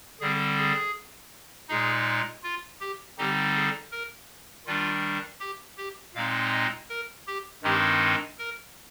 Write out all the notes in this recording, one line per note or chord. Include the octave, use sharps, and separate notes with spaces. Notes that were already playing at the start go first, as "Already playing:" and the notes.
D3 G3 C4 G#4
G#4
A#2 G#3 D#4 G#4
F4
G4
D3 G3 C4 D#4 G4
G#4
A#4
D#3 G3 D4 F4
G4
G4
A#2 G#3 C4 D#4 F5
D#5
A#4
G4
G2 D#3 G#3 C4 D#4 G4
A#4